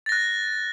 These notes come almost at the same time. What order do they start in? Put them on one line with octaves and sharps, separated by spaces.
A6 A#6 F#6